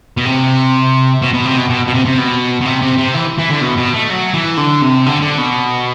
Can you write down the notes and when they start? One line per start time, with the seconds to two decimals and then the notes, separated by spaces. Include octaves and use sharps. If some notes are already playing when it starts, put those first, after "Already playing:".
0.17 B2
0.25 C3
1.22 B2
1.34 B2
1.45 C3
1.58 B2
1.69 B2
1.87 B2
1.94 C3
2.05 C3
2.18 B2
2.61 B2
2.65 C3
2.82 C3
2.98 C3
3.14 E3
3.38 E3
3.50 D3
3.61 B2
3.78 B2
3.94 A3
4.10 F#3
4.34 E3
4.58 D3
4.82 C3
5.06 D3
5.22 D3
5.38 B2